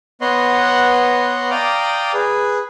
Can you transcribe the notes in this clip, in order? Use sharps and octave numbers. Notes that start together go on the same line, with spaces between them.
B3 B4 C#5 D#5 F#5 C6
D5 F5 G5 A#5 D6 D#6
G#4 B4